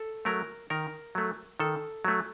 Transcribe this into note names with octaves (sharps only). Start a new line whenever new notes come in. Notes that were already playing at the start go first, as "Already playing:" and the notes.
Already playing: A4
F#3 A3 A#4
D#3 A#4
F#3 A3
D#3 A4
F#3 A3